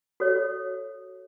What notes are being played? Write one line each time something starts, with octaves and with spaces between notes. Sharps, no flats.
F#4 A4 C#5